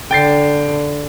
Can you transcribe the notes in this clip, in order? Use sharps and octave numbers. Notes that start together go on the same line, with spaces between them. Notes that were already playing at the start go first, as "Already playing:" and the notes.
D3 G5 A6 C7